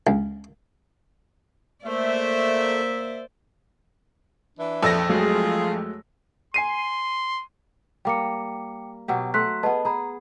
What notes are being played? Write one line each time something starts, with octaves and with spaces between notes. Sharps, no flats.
C#2
A3 A#3 C5 D5 E5
E3 D4
A#1 F2 A4 E6 A#6
F#3 G#3 A3 F4 G#4
G#5 C6 C7 D#7
G3 A#3 G5 D6 C#7
B2 F#3 G4
A3 F#5 C6 F#6 B6
B3 G#4 B4 D#5 A5
G#4 A#5 B5